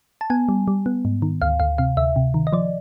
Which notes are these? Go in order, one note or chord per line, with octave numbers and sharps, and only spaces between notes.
A5
B3 G#5
G3
G3
B3
G#2
D#3
D2 F5
D2 F5
C3 F5
D2 E5
C3
D#3
D#5
F3 D5